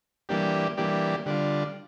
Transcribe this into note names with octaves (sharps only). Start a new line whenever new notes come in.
E3 G3 A#3 D4 G4
E3 G3 A#3 D4 G4
D3 G3 D4 F4